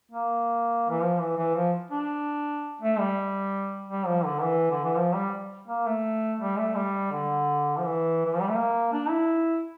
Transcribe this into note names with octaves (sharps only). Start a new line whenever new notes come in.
A#3
E3
F3
E3
E3
F3
D4
A3
G3
G3
F3
D3
E3
D3
E3
F3
G3
A#3
A3
G3
A3
G3
D3
F3
E3
E3
F3
G3
A3
A#3
D4
E4